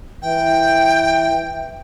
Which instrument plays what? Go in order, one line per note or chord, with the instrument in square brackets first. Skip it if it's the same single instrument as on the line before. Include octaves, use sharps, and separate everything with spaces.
[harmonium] E3 [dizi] G5